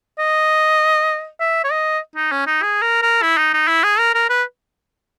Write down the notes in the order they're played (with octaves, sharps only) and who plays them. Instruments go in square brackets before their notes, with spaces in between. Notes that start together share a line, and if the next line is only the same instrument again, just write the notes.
[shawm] D#5
E5
C#5
D#5
D#4
C#4
D#4
G#4
A#4
A#4
E4
D#4
D#4
E4
G#4
A#4
A#4
B4